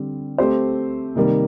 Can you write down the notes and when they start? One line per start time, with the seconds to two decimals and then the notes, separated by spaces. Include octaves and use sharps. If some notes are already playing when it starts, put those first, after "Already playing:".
Already playing: D3 G3 C4
0.38 A3 C4 G4 C5
1.15 C3 D#3 G3 A#3